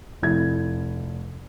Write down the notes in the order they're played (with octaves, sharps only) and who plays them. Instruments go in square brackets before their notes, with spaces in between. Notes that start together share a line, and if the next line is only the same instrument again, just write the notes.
[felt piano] F1 E4 G#6